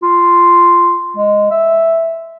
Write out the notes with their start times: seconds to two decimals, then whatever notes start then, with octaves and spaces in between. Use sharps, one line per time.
0.03 F4
1.17 G#3
1.51 E5